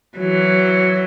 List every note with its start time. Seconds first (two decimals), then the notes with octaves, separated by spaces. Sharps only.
0.18 E3 F#3